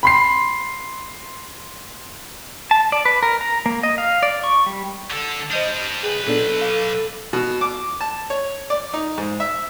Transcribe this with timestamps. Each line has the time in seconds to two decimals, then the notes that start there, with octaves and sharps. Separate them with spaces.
0.03 B5 C6 C7
2.71 A5
2.92 D5
3.05 B4
3.23 A#4
3.41 A#5
3.66 A#3
3.83 D#5
3.98 F5
4.23 D5
4.44 C#6
4.66 G3
5.10 D3 A4
5.51 G3 D4 C5 D#5 D#6
6.03 B1 G#4 B4
6.27 A#2 B3 D4 A4
6.61 F5 D6
7.33 B2
7.61 D6
8.01 A5
8.30 C#5
8.70 D5
8.94 D#4
9.18 G#2
9.40 E5